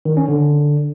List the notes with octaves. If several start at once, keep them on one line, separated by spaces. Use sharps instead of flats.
D#3
C#4
D3